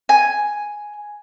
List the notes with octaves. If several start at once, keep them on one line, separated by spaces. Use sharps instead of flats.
G#5